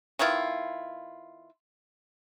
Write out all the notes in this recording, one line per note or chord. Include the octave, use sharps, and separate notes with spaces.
D#3 B3 E4 F4